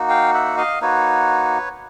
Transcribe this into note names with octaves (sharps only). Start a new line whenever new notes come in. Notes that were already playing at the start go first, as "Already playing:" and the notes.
Already playing: A#3 D#4 F#4
F5 G5
E5 F#5
D#5 F5
A#3 D#4 F#4 B4 C#5